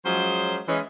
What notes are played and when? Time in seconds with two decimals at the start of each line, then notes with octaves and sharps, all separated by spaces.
0.06 F3 F#3 G#3 C#4 G#4 C5
0.68 E3 G#3 C#4